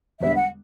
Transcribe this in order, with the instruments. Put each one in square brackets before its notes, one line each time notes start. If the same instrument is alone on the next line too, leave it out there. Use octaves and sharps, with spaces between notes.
[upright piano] E1 E2 D3 G3 B3 [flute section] E5
[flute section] F#5